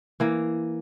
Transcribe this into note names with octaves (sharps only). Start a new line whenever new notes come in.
E3 A#3